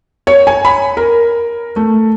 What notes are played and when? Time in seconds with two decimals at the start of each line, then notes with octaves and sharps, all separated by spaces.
0.27 C#5
0.47 G#5
0.65 B5
0.97 A#4
1.76 A3